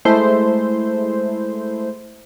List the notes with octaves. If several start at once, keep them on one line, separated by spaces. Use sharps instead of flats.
G#3 A3 E4 C5